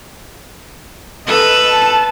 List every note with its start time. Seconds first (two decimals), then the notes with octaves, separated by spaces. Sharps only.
1.27 A4 B4 D#5
1.70 A5